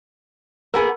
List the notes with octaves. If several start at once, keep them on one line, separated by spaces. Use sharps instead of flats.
A#3 B3 G#4 A#4